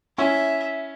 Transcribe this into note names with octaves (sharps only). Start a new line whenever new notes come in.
C#4 E4 E5